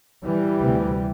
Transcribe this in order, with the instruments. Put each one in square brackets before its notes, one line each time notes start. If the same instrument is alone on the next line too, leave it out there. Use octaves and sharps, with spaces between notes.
[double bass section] E3 G3
D2 C3